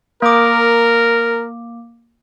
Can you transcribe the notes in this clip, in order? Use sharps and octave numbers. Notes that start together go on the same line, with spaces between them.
A#3 A#4 D6